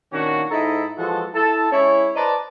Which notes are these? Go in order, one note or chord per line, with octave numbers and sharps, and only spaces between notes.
A#2 D#3 A#3 C#4 D4 F#4
G#2 D#4 E4 A4 D#5 A#5
E3 F3 G#3 F#4 A4
E4 A4 A5
G#3 C#4 E4 C#5
B4 C5 D5 D#5 A5 A#5